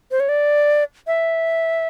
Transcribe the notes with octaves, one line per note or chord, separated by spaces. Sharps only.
C5
C#5
D5
E5